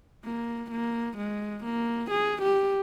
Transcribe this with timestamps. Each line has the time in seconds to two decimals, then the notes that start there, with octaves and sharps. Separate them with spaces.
0.25 A#3
0.71 A#3
1.18 G#3
1.65 A#3
2.11 G#4
2.42 G4